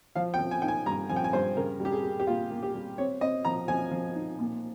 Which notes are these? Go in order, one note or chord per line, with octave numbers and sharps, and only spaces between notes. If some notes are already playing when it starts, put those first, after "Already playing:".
F3 F5
G5
F3
G#5
D#4 G5
G#5
G2 A#5
F3 G#5
G5
G#5
G2 C5
C#3 A#4
G3
G4
G#4
G3
G4
A#3 F4
A#3
G4
G3
C4 C#5
C4 D#5
F3 A#5
F3 G#5
F3
D#4
A#2